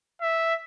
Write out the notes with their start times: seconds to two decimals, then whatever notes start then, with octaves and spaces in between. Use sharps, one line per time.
0.22 E5